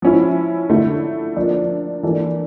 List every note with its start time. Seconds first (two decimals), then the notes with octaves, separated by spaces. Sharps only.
0.02 F3 C#4 E4
0.70 D3 A3 E4
1.36 F3 A#3 D4
2.03 E3 A#3 D4 A4